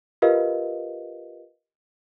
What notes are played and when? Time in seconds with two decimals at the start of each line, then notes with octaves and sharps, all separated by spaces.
0.22 F4 G4 A#4 B4 D#5 F5